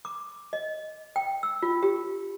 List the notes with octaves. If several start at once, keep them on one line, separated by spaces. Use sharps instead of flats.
D6
D#5
G5
E6
F4
G4